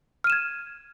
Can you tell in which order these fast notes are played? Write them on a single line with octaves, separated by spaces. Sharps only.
F6 D#7 E7 G#6